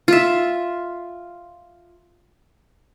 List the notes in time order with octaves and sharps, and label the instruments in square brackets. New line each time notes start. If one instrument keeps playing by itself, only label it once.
[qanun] F4 E5